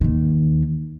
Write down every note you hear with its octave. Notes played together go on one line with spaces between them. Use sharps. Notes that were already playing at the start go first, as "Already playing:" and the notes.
D#2 D#3